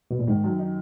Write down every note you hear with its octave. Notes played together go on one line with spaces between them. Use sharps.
B2
A#2
G#2 D#3
F#2
D#4